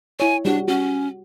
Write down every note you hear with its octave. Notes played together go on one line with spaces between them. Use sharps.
E4 C#5 G#5
G3 D4 F#4
C#4 F#4